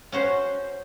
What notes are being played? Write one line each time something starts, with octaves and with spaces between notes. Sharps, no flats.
C#4 F#4 C5